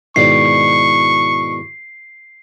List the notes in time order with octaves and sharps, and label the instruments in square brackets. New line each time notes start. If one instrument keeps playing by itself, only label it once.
[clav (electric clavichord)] G#2 B2 D#3 [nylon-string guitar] E4 D5 [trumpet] C#6 [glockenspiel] C7